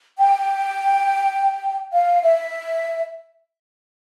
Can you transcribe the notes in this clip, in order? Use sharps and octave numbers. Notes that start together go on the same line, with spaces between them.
G5
F5
E5